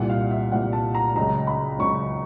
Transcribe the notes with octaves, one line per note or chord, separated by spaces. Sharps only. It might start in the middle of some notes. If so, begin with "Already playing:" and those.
Already playing: C2 A#2 G3 F#5
F5
E5
C2 A#2 G3 F#5
A5
A#5
C#2 C#3 F#3 A#5
B5
C#2 C#3 F#3 C#6